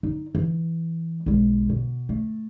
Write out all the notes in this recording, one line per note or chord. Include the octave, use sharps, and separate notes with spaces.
D#4
E3
B1 G#3
B2
A3